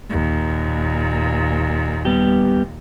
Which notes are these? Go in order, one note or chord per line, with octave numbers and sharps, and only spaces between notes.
D#2 A#2
G3 B3 G4